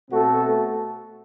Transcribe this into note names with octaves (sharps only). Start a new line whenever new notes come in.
B2 A3 C4 F#4 A4